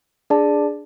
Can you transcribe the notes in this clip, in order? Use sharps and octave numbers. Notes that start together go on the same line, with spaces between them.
D4 G#4 D5 A5